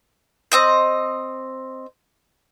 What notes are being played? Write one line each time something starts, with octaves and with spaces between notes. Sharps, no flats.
C4 D#5 G6